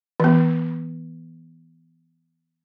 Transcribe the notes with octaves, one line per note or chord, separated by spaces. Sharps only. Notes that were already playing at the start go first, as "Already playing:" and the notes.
E3 B3